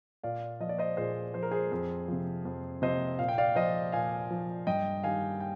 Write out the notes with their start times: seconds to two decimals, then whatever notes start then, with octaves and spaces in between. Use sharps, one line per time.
0.23 A#2 D5 F5
0.60 F3 D#5
0.69 D5
0.78 C5 D#5
0.97 A#2 G#4 C5
1.34 F3 C5
1.43 A#4
1.51 G#4 C5
1.71 F2
2.08 C3 F3
2.45 F2
2.82 C3 F3 C5 D#5
3.19 A#2 F5
3.28 G5
3.38 D5 F5
3.55 F3 C5 D#5
3.92 A#2 F5 G#5
4.31 F3
4.67 G2 D#5 G5
5.03 D#3 G3 F5 G#5
5.40 G5